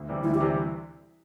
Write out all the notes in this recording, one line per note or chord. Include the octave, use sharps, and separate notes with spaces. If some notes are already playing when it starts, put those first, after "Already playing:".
Already playing: D2
C3 E3 G3
D2 E4
G4
C3 E3 G3